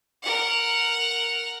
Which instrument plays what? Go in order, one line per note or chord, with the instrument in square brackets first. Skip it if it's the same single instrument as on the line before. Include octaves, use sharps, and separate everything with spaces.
[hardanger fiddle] A#4 F#5